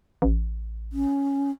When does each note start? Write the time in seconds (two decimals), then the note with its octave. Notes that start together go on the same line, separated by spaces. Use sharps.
0.22 A1
0.93 C#4